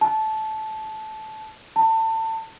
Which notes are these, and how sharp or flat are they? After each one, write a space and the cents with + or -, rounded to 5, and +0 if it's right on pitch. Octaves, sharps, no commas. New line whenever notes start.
A5 -15
A5 +30